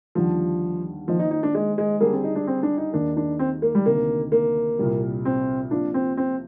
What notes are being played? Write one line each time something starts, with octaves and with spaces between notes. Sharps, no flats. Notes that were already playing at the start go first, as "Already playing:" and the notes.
D#2 D3 F3 G3 D4 F4
D#3 F3 A#3 F4 C5 D#5
D#4
D#4
D4
G#3
G#3
D3 G3 A#3 D4 G#4
C4
D#4
D4
C4
D4
D#4
D#2 D#3 A#3 D4 D#4 A#4
D4
C4
A#3
G3
D2 C3 D#3 A#3
A#3
C2 A#2 G3
C4
C3 F3 A#3 D4 F4
C4
C4